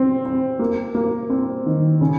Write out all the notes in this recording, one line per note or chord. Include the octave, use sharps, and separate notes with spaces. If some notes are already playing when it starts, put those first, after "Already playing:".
Already playing: C4
C4
A#3
A#3
C4
D#3
C#3